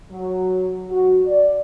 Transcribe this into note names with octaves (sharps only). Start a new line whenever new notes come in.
F#3
F#4
D5